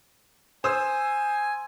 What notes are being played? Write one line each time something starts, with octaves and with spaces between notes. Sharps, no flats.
C5 G#5 D#6 E6